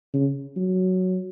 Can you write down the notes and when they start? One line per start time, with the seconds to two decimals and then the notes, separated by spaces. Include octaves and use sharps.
0.14 C#3
0.56 F#3